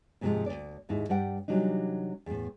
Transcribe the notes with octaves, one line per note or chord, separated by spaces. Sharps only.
D#2 G#2 C3 E3 F3 G#3
D2 G#2 D5
D#2 G#2 D#4 E4
G2 G3 D5 F#5 G5
C3 E3 F#3 G3 D4 D#4
E2 A2